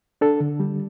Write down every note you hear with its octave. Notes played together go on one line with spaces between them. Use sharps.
D4 A4
D3
G3